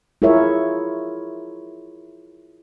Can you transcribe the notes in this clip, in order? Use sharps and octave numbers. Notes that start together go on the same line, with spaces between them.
E4 F4 G#4 A#4 C#5 E5